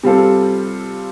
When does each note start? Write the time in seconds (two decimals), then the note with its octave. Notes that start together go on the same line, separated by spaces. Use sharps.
0.03 C3 G3 C4 F4 A4